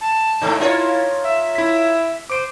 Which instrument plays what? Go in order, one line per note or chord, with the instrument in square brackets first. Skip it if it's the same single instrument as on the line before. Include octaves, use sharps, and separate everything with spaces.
[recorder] A5
[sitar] G#2 A3 [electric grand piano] D#4
[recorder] E4 [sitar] F4 A#4 C#5
[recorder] E5
[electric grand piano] E4 B6
[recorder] C5 [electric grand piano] D6 D7